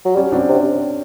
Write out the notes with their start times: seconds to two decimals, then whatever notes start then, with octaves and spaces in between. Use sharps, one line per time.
0.05 F#3
0.16 G3 C#4
0.32 F#3 C4 D4
0.49 C3